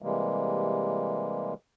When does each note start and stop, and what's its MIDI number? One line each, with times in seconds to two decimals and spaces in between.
0.02 1.54 48
0.02 1.54 52
0.02 1.54 55
0.02 1.54 56
0.02 1.54 58